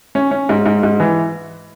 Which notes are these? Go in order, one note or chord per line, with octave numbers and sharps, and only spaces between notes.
C#4
C#4
G#2
G#2
G#2
E3